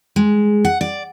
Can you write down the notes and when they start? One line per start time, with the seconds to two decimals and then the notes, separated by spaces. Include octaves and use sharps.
0.16 G#3
0.65 F#5
0.81 D5